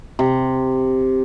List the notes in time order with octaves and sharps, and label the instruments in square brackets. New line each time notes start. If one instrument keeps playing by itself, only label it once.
[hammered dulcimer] C3